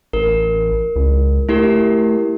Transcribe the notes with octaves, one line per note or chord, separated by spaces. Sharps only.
A1 A#4
C#2
A3 E4 G4 A#4